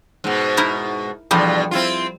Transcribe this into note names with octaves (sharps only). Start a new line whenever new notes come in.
G#2 B2
D#4 E4 A#4
E2 G2 B2 F3 G3 A4
C4 E4 F4